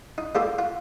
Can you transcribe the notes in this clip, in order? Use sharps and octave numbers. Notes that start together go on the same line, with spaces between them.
D#4
G3 A#3 F4 G4 A4
F4